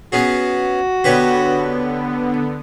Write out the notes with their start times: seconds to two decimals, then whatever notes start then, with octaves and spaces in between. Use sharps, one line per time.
0.12 B3 C#4 F#4 G#4
1.04 D3 B3 G4 B4 C#5